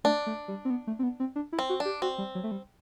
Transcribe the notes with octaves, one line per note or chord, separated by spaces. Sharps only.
A3 D4
A3
G3
C4
B3
A3
C4
B3
C4
D4
E4
C4
F#4
D4
G4
C4 F#4
G3
F#3
A3
G3